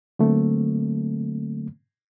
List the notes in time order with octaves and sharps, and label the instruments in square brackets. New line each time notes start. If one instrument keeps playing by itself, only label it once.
[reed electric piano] D3 F#3 A3 A#3 C4